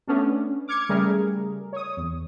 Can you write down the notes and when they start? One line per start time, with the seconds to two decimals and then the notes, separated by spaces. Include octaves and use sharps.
0.08 A3 B3 C#4 D4
0.68 D6 F6 G#6 C#7
0.89 C#3 G3 A3 G#4 A#4
1.73 C#5 D#6
1.97 E2